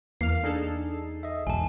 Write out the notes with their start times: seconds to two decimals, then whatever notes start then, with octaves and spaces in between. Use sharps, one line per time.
0.21 E2 A#3 F5 F6 C7
0.44 D4 D#4 G#4 A4
1.23 D#5 E5
1.47 B1 E2 G#2 G#5 A5